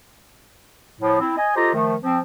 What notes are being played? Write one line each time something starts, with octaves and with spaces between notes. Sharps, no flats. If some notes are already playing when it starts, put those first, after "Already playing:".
A2 F3
C4 E4
D#5 G#5
F4 G4 A4 C5 D#5 A#5
D#3 F3 A3
F3 C4